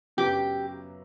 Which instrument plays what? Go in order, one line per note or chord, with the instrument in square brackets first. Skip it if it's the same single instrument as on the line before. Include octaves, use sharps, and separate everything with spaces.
[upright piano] F#2 C#3 F#3 B3 F#4 [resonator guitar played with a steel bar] G4